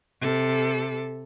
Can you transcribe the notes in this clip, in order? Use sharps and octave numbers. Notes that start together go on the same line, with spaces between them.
C3 A4